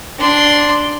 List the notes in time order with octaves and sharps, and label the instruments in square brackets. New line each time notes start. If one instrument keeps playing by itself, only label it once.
[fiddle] D4 C6